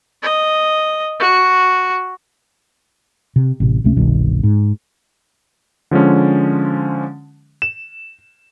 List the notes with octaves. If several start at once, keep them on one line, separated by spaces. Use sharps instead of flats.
D#5
F#4
C3
A1 C3
C#2 C3 A3 C#4
G1 C2 B2 D#3
G#2
D3 F3 G#3 C#4
E7